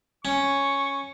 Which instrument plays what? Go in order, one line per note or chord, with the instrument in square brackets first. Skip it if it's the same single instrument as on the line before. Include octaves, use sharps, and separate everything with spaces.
[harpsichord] C#4 [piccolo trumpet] C#6